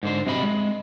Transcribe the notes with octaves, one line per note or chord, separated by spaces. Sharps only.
G#2 D3 C5
F#2 C3 D#5 B5
G#3